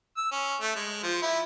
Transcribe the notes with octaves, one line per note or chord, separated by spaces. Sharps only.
E6
C#4
A3
G#3
F3
E4